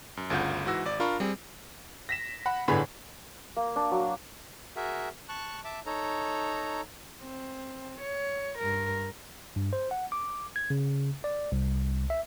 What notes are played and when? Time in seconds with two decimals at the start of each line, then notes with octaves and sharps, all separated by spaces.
0.17 F#2
0.30 G1 D2 C#3 F4 F#5 G6
0.66 G#2 E3 F#4 E6 A#6
0.85 G#1 D5
1.00 D4 F4 A#4 B5 C#6
1.20 G3 C4 G#4
2.09 A#6 B6 E7
2.46 F#5 B5
2.68 G1 A2 D3 G#4 B4 B5
3.56 A#3
3.76 D4
3.91 F#3
4.76 F#4 G#4 A#4 E5
5.29 A5 C#6 F#6
5.65 E5 A5 D6
5.86 D#4 A4 C#5 A#5
7.22 C4
8.01 C#5
8.59 G2 A#4
9.56 G2
9.73 C5
9.91 F#5
10.12 D6
10.56 G#6
10.70 C#3
11.24 D5
11.52 C2
12.10 E5